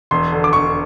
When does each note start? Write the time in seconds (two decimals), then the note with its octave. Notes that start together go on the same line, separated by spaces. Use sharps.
0.11 E1 C6
0.32 D3
0.44 D6
0.53 E1 C#6